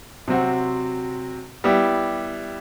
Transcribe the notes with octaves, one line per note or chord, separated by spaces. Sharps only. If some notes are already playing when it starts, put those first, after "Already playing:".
C3 F#3 C4 F#4
G3 B3 E4 G4